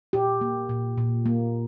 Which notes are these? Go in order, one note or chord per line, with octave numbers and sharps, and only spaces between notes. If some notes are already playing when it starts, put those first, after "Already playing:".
A#2 G4
A#3
A#2
A#2
A#3